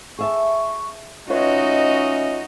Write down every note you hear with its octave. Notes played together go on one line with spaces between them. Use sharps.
G#4 E5 A5 C#6
C#4 D#4 F4 F#4 B4 C#5 D#5 E5